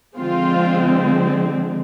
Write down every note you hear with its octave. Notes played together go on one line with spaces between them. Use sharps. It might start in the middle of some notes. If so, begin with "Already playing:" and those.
D3 F3 G#3 C4 F4